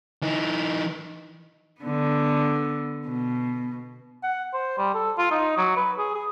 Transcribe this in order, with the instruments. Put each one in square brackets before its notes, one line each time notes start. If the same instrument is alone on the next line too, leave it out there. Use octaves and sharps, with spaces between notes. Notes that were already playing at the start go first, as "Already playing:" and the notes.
[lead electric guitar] E3 D#4
[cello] D3 B3
B2
[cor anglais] F#5
C5
G3
A4
F4
D#4
F#3
B4
G#4
G#4